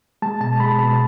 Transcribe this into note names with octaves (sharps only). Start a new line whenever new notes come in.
G#3 A5
B2 A5
G#3 B5
B2 A5